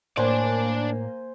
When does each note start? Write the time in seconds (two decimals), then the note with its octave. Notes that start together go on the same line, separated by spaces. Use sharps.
0.17 A2 A#3 D4 C5 D5 G#5